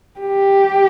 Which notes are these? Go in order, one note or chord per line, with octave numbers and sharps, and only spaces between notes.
G4